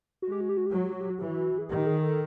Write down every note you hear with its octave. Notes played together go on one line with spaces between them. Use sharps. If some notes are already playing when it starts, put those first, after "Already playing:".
G#3 F#4
G4
F#4
G4
F#4
G4
F#3 F#4
G4
F#4
G4
F#4
E3 G4
F#4
G#4
D#3 G4
G#4
A4